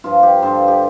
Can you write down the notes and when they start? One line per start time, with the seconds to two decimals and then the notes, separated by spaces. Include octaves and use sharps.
0.04 G2 F3 F4
0.23 G4
0.42 G2 D3 F3 C5
0.68 G4